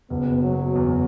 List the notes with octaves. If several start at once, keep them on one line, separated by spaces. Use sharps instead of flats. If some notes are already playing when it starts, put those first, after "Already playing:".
F#1 B3
B2
F#3
B2
E2